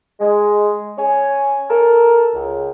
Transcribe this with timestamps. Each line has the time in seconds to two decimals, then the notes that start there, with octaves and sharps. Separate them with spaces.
0.20 G#3
0.98 C#4 C#5 G#5
1.69 A4 A#4
2.34 C#2